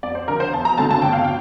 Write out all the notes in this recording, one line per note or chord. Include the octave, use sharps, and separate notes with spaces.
F2 D5
C5
D3 F3 A#4
C5
E2 A5
A#5
D3 A3 C4 A5
A5
G1 G5
F5
G5